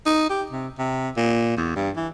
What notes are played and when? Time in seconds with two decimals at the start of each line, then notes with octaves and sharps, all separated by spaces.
0.06 D#4
0.30 G4
0.50 C3
0.78 C3
1.17 A#2
1.57 E2
1.76 G2
1.96 E3